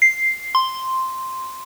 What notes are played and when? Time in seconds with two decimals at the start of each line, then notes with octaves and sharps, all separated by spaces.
0.02 C7
0.55 C6